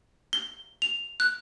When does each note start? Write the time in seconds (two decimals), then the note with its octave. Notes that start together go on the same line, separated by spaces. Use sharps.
0.33 G7
0.82 F7
1.20 F#6